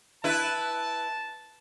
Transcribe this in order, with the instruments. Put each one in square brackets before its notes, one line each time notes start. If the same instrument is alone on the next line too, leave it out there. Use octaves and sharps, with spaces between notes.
[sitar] E4 B4 [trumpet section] A5